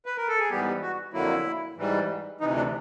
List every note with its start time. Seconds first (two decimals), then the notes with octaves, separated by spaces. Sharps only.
0.06 B4
0.17 A#4
0.28 A4
0.39 G#4
0.50 G#2 E3 G3 B3 G4
0.82 F#4
1.13 F2 D3 F#3 A#3 E4
1.77 G#2 E3 G3
2.41 D2 C3 E3 D#4
2.56 D4